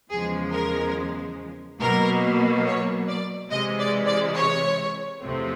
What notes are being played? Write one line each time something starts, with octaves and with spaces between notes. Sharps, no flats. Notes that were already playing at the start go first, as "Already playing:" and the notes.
E2 C#3 F3 G#3 G#4
A#4
B2 F#3 A#3 A#4
C#5
D5
C3 E3 G#3 D#5
D5
D5
C#5
E2 C3 F3 A3 C4